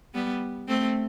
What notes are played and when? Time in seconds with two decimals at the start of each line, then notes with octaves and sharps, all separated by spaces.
0.14 G3 B3
0.68 A3 C4